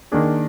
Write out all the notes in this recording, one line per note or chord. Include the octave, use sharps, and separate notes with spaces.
D#3 A#3 D4 G#4